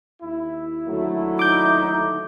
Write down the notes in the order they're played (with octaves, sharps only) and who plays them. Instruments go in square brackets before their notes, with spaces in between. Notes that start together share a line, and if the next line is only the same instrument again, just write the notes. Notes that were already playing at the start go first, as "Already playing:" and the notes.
[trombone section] D#2 E4
[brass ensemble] D2 F#3 A3
[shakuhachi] D#4 [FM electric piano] D6 G6